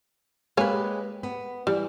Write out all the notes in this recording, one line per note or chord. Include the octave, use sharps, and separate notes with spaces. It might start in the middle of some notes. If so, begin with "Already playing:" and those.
G#3 A#3 G4 B4 C#5 G#5
B3
E3 G3